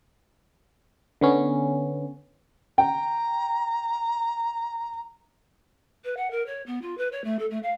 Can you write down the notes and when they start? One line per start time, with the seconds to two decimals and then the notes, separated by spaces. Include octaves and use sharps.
1.21 D3 B3 C#4
2.78 G5 A#5
6.04 B4
6.17 F#5
6.31 A#4
6.46 C#5
6.66 B3
6.82 F4
6.98 B4
7.12 C#5
7.24 A3
7.39 A4
7.50 A3
7.63 F5